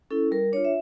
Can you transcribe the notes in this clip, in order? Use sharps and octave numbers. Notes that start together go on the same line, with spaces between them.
C#4 E4 A4
G3 A#4
D4 F4 C#5
E5